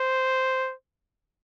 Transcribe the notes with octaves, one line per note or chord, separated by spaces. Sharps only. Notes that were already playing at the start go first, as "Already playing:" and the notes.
Already playing: C5